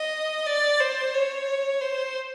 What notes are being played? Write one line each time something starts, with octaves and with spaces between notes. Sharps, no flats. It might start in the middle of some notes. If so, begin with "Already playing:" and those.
Already playing: D#5
D5
C5
C#5
C5